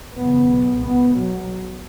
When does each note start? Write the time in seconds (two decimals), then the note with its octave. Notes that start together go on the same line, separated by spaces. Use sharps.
0.15 F#1 E2 C#3 B3
0.49 B1 B2
0.80 C#2 B2 B3
1.13 B1 B2 F#3